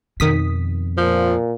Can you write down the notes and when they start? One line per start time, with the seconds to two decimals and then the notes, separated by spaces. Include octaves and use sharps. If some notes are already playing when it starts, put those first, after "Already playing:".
0.20 F2 B2 D#3 D#6 B6
0.98 A#2 F3